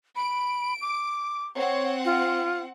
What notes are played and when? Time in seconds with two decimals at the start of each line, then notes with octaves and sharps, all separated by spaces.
0.16 B5 D7
0.81 D6
1.56 C4 C#5 F#5
2.05 F4